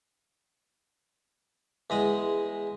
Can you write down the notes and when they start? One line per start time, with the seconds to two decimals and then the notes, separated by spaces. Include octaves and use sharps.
1.90 E2 G#3 D#5